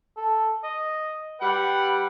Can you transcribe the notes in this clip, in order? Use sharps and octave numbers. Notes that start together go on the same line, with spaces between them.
A4
D#5
G3 G4 B4 F#5